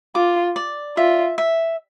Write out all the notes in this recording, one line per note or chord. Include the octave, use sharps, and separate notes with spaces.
F4 D6
D5
F4 E5
E5